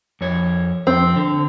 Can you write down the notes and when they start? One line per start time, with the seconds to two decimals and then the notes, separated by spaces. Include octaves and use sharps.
0.21 F2 C#5
0.87 F2 C4
1.16 D3